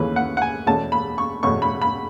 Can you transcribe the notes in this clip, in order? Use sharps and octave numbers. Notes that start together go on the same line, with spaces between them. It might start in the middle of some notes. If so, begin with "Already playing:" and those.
Already playing: D#2 C#3 E3 A3 C#4 B4
F#5
F#5
G#5
E2 B2 A3 C#4 A5
B5
C#6
E2 B2 A3 C#4 C#6
B5
B5